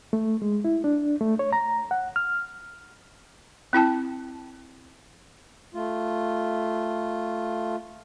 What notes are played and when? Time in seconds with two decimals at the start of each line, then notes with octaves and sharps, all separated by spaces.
0.13 A3
0.42 G#3
0.65 E4
0.84 D4
1.21 A3
1.39 C#5
1.53 A#5
1.91 F#5
2.16 F6
3.73 C4 E4 G5 A5
5.74 A3 F4